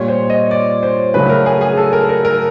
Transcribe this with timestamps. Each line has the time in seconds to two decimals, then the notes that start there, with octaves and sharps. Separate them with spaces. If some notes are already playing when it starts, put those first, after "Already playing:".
Already playing: A#2 G3 C#5
0.08 C5
0.30 D#5
0.51 D5
0.83 C5
1.14 C#3 F#3 A3 B4
1.30 A#4
1.46 G#4
1.61 G#4
1.77 A4
1.93 A#4
2.09 A#4
2.25 A#4